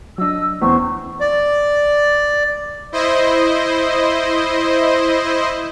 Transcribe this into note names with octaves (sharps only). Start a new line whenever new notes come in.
F#3 D4 D#5 E6
E2 C4 C#4 C5 C#6
D5
E4 C5 D#5